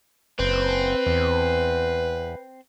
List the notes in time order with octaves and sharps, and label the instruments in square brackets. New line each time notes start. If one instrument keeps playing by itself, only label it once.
[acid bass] F#1 [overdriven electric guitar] C4 [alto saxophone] B4
[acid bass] E2